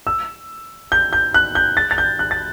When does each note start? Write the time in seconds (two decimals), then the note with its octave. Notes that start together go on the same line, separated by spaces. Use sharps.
0.07 E6
0.92 G6
1.13 G6
1.34 F#6
1.55 G6
1.77 A6
1.91 A6
1.98 G6
2.19 F#6
2.31 A6